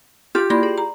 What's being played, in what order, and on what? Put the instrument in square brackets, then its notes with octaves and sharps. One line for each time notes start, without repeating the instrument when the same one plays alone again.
[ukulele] F4 G4 [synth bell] F6
[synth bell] A#3 E4 A#6 [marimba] D5 B5 C6
[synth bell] G#4
[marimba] A#5